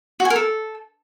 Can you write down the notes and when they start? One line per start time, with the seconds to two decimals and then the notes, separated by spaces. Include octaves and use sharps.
0.20 F#4
0.25 G#5
0.30 A#4
0.36 A4